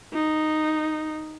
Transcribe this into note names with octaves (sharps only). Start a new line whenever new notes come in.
D#4